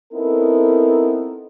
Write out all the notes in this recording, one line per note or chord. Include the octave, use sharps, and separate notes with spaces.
B3 C4 D#4 E4 A4 A#4